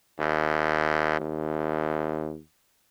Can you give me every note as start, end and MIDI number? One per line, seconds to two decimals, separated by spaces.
0.19 1.18 39
1.20 2.38 39